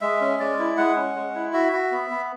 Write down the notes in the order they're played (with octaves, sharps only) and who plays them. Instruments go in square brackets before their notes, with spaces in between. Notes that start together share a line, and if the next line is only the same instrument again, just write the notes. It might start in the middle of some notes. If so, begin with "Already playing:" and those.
[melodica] G#3 E5
C#4
G#3 D5
E4
G#3 F#5
C#4
G#3
E4
F#4 E5
F#4
B3
B3